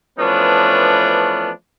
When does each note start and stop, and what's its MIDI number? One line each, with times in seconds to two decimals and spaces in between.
0.19 1.50 52
0.19 1.50 53
0.19 1.50 57
0.19 1.50 59
0.19 1.50 61
0.19 1.50 62